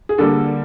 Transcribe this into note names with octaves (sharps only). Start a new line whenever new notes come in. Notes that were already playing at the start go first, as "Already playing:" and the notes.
G#4
D3 G3 A#3 A4